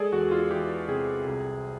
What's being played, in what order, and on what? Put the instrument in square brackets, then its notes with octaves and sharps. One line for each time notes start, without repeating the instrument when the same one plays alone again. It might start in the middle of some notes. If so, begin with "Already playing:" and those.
Already playing: [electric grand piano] G#3 G#4 A4 D5
E2 F#4
F4
E3 G4
C3 G#4
C2